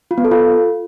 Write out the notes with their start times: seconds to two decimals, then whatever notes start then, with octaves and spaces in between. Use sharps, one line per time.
0.11 F4
0.18 B3
0.25 A4
0.31 F4